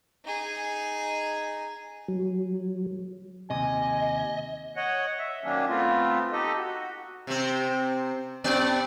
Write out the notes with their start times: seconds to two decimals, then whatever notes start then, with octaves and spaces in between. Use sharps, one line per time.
0.25 D#4 G#4
2.08 F#3
3.50 D#2 C3 D#5 G#5
4.76 C#5 D#5 F#5
5.19 E5
5.44 D#3 F#3 A#3 C#4 D4
5.69 A3 B3 C4 F4
6.32 D#4 G4 A4 D#5
6.57 F#4
7.27 C3 C4
8.44 G2 B3 D5